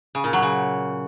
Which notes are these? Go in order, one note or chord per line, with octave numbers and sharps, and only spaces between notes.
C#3
A#2
F#3
C#3